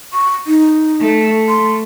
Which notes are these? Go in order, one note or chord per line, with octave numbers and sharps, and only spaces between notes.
C#6
D#4
A3
C6